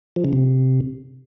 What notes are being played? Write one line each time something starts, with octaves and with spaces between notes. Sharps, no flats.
F3
C#3
C3